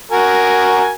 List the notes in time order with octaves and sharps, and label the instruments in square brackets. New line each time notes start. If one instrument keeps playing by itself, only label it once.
[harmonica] F#4 A#4 G#5